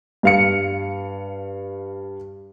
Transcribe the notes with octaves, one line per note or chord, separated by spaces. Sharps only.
G2 F5 C#7